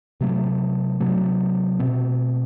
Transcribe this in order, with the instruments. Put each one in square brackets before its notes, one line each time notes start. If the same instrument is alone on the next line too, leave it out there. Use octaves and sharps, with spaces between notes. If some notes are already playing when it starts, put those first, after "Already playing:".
[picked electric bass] C3 F#3 A3
C3 F#3 A3
B2 A3 C4